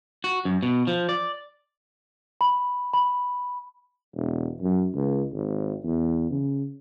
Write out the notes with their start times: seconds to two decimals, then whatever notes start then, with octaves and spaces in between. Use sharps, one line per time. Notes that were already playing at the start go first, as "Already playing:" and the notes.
0.24 F#4
0.45 F#2
0.63 B2
0.87 F3
1.09 D5
2.41 B5
2.93 B5
4.15 E1
4.62 F#2
4.95 C#2
5.32 G#1
5.84 E2
6.31 C#3